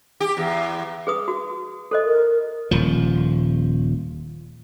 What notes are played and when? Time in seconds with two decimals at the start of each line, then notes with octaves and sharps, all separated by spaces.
0.20 G4
0.37 E2
1.07 G#4 B4 D#6
1.28 F#4
1.91 A4 C5 D#5
2.05 A#4
2.71 D#1 F3